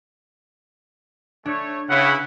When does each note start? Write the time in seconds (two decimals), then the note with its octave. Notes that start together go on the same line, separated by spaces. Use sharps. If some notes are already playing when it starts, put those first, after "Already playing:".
1.46 A3 D4 C#5
1.90 C#3 E4 B4 F#5 B5